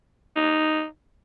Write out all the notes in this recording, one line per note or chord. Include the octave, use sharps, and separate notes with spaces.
D#4